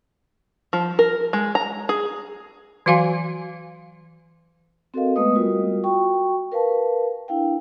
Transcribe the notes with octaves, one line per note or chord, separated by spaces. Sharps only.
F3
A#4
G#3
A#5
G#4
E3 F#3 F#4 F5 G#5 C6
C4 F#4 A4 A#4 D#5 F5
G#3 A3 B3 B4 D#5 D#6
G3 F4 F#4 A#4
F#4 G5 C#6
A#4 B4 F5 A5
D4 E4 F5 G5